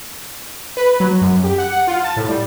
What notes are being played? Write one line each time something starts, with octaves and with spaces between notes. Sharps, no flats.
B4
F#3
F#2
G4
F#5
F#5
F4
A5
A2
G3